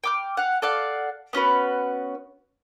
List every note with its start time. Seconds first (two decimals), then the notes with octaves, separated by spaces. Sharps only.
0.04 G5 D6 F6
0.37 F5 F#5
0.62 A4 D5 F5 F#5
1.33 B3 C#4 F#4 B4